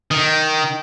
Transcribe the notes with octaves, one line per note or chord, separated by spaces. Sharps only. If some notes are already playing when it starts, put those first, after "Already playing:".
D#3